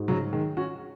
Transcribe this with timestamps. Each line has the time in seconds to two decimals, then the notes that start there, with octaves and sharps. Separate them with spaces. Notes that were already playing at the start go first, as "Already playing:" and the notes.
Already playing: G#2 G#3 F#4
0.08 C#3 F#3
0.33 D#3 G#3
0.57 C#4 F#4